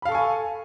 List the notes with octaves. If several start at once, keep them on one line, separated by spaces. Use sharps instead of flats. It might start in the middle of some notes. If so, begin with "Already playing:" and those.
A4 F5 G#5 B5 C#6